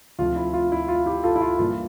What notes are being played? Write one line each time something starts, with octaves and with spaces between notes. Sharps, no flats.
D2 C3 F3 A3 F4
E4
F4
E4
F4
E4 G4
F4 A4
E4
F4
G2 E3 A#3 F4